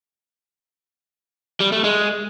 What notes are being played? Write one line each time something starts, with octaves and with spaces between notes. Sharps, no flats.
G3
A3
G#3